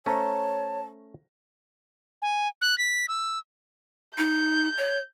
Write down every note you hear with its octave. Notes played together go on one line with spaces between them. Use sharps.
A3 C#4 C5 C#5 A5 A#5
G#5
F#6
B6
E6
D#4 G6
C#5